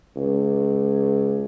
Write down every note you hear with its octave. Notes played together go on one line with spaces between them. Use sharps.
C#2